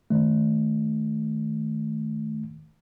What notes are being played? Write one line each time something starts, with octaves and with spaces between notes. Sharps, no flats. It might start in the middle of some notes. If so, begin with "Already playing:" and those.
D#3 A3